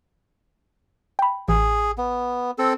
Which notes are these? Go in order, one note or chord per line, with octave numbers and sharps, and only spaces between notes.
G5 B5
A1 G#4
B3
C4 A4